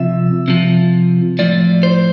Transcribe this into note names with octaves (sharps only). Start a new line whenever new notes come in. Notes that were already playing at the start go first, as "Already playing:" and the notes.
Already playing: C3 F3 E5
C3 F3
A2 F3 D5
C5